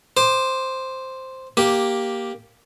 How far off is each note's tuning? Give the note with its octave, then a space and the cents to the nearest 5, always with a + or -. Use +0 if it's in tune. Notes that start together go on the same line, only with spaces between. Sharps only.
C5 +0 D6 +25
A#3 +5 G4 +0